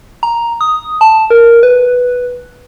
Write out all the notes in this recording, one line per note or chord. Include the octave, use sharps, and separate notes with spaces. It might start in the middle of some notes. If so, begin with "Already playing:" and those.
A#5
D#6
A5
A#4
B4